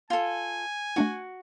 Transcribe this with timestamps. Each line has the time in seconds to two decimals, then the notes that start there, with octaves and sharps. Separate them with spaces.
0.10 F4 A4 G#5
0.96 A3 D4 E4 F#4